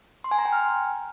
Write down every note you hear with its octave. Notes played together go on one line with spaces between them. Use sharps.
C6
G#5
A#5
G5
F6